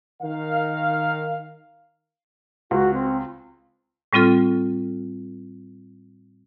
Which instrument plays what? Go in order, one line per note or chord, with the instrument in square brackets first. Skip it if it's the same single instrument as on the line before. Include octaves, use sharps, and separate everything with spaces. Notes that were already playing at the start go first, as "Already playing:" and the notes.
[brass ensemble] D#3 A#4 F5
[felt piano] C#2 [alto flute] F#4
[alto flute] C4
[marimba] A2 G3 C4 F4 A4 F6